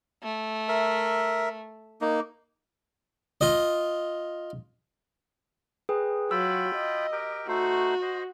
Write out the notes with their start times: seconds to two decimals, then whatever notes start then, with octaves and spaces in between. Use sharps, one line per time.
0.23 A3
0.68 A#4 E5
2.01 A#3 D#4
3.41 F4 D#5
5.89 G#4 B4 G5
6.31 F#3 F4 G5 B5 E6
6.75 D#5
7.12 G4 A#4 G5
7.48 A3 D#4 F#4 C5
8.02 C5 D#5